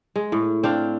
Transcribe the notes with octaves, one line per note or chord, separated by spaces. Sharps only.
G#3
A2
C4 D4 F5